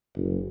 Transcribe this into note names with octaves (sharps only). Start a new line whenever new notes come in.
F#1